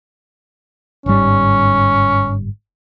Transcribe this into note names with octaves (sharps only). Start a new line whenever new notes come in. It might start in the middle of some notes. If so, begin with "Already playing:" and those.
G1 G#2 G3 C#4